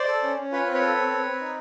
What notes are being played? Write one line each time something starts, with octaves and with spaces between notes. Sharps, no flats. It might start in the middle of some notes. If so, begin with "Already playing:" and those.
Already playing: C5 D5
A4
C#4
C#4
F4 B4 C#5
C4
B4 C#5
A4
C4
C4
C4
D#4